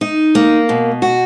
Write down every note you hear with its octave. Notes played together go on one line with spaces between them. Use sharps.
D#4
A#3
B2
F#4